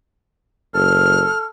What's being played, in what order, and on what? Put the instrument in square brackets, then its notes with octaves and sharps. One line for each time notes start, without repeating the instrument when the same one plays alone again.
[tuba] F#1 [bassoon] A4 [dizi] F6